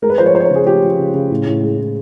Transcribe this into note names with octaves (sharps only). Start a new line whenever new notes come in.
G#3 A#4
B4
F3 C5
C#5
F3 C5
C#5
C5
C#3 G#4
F3 G4
F3
C#3
C#3
A2
A2
G#3
A2